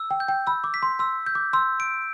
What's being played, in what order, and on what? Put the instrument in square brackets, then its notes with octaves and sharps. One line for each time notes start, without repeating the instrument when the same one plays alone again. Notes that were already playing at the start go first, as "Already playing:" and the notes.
Already playing: [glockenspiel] E6
[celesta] G5
[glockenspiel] G6
[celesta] G5
[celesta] B5 [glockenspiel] E6
[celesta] D6
[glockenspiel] B6
[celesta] C6
[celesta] C6 [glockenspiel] E6
[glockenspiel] G6
[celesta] D6
[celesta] C6 [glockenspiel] E6
[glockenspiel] D7